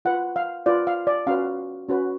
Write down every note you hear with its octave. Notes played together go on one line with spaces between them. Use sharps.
F4 B4 F#5
F5
F4 B4 D5
F5
D5
C#4 F#4 B4 F5
C#4 F#4 B4